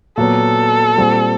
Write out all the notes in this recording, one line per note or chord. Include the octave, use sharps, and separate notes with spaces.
A#2 F#3 B3 A4
A#2 G3 C4 F4